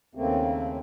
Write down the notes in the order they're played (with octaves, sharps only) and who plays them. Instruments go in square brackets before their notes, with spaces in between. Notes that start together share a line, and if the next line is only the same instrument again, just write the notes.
[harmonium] D#2 C#3 A3 A#3 C4